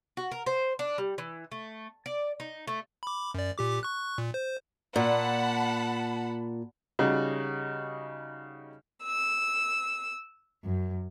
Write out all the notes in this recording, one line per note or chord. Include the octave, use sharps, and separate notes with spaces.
F#4
A#4
C5
D4
G3
E3
A3
D5
D#4
A3
B5 D6
F#2 D5
A#2 G4 D6
C#6 F#6
A#2
C5
A#2 F#5 A5 B5
C#3 G3 D#4 F#4
E6
F#2